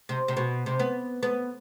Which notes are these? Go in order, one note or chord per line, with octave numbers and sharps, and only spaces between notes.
C3
C3
B2
C3
B3
B3